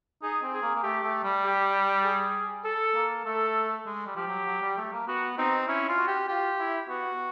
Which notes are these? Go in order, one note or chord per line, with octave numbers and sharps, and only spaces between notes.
D#4 G#4
C4
G#4
A#3
A#3
A3 G4
A3
G3
G4
G#4
A4
A#3
A3 A4
G#3
G3
F3 G4
F#3
F#3
G3
A3
A#3
B3 F#4
C4 D#4
C#4 E4
F4
F#4
G4
F4 G4
E4
B3 F#4